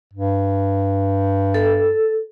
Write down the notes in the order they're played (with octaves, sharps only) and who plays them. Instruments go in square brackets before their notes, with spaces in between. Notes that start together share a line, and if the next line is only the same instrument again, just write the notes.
[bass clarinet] G2
[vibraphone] A4